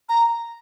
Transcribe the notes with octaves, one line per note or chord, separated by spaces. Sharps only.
A#5